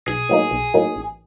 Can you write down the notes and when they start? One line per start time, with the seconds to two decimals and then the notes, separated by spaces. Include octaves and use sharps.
0.07 B1 G#4
0.29 A2 F#3 A#3 D#4
0.51 B1
0.74 A2 F#3 A#3 D#4
0.95 A1